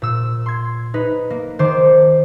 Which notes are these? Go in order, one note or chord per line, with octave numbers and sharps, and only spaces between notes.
A#2 E6
C6 G#6
D#4 B4
A#3
D#3 C5 D6